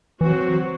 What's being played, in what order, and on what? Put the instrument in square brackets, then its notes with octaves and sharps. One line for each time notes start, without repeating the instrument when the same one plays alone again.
[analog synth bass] E3 [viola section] F#3 C4 F#4